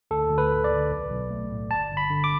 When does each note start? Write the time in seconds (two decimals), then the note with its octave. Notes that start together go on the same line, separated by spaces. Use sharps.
0.11 D2 A4
0.30 D2
0.38 B4
0.50 A3
0.64 D5
0.71 D3
0.91 B1
1.11 B1
1.31 A3
1.50 A2
1.70 G1 A5
1.91 G1
1.97 B5
2.11 D3
2.24 D6